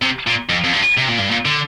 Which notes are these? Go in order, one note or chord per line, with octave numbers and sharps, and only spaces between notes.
C3
A#2
F2
F2
G2
C3
A#2
G2
A#2
D3